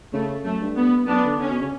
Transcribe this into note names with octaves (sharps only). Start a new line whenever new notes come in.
C#3 A3
F#2 A3
G2
B3
F#2 B3 D4
D3
D3 C#4
B2
C#3